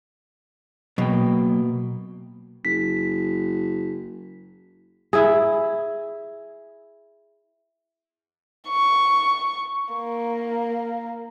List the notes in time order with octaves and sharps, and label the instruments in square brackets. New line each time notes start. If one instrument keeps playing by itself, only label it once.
[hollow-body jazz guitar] B2 [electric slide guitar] F#3 A#3 G5
[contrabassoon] F#1 [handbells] B6
[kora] E4 G#4
[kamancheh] C#6
A#3